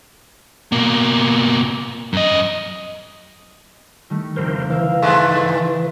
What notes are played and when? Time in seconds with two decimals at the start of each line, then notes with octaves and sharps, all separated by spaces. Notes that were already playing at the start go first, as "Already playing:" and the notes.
0.72 B2 A#3
2.13 F#2 D#5
4.10 D#3 G3 A3
4.36 F1 C#3 A#4 C5
4.70 E3 A#4 E5 F5
5.02 G2 G#3 A3